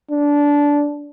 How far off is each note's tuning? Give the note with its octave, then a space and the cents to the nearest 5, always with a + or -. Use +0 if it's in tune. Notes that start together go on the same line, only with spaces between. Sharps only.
D4 -15